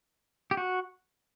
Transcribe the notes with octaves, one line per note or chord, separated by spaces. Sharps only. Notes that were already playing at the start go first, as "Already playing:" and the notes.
G4
F#4